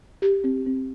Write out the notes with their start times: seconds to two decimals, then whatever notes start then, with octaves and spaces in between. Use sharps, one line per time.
0.22 G4
0.44 C4
0.67 C4